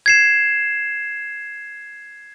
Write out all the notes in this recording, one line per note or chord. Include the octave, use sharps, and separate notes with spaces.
G#6 C7 E7